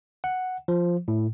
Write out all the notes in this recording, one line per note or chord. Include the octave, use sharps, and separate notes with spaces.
F#5
F3
A2